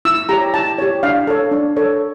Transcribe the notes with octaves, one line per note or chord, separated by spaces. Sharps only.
E4 E6
G4 C#5 A#5
E4 A5
G4 C#5
D4 F5
A4 C#5
D4
A4 C#5